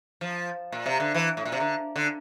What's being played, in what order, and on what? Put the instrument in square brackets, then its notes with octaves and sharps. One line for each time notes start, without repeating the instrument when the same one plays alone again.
[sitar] F3
A#2
C3
D3
E3
A2
A#2
C3
D3
D3